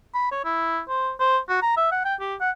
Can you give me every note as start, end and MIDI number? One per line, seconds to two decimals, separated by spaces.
0.14 0.31 83
0.32 0.40 73
0.45 0.81 64
0.89 1.11 72
1.20 1.38 72
1.49 1.60 66
1.62 1.77 82
1.77 1.89 76
1.92 2.00 78
2.05 2.15 79
2.20 2.35 67
2.40 2.50 78